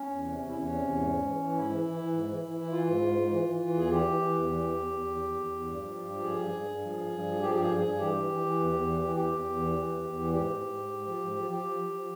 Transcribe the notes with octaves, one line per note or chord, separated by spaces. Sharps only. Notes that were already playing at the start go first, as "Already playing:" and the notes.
Already playing: C#4
E2
C3
E2 C#4
E2 E4
C#4
C3
E2
G#2
G#2
E3
E3
G#2 E4
E3
E3
E3
G#2
E3
E3
E3
E3 F4
G#2
G#2
G#2
E3
E3
E3
E2 G#4
E3 G4
E3
E3
E2
E3
E2
E2
E2
E2
E2
E2
E2
G2
F3
G2
F3
G2 G#4
G2
G2
G2
F3
G2
G2
F3
F3 G4
G2 G4
G#4
G2
G2 G#4
E3 G4
E3
E3
E3
E2
E2
E3
E3
E2 G4
E2
E2
E3
E3
E2
E2
E3
G#2 G4
G#2
G#2
G#2
G#2
F3
G#2
F3
F3 G4
F3
F3
F3